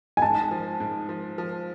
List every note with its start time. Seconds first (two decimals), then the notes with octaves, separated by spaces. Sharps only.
0.17 G#5
0.22 G#2 A5
0.51 F3
0.80 G#2
1.09 F3
1.38 F3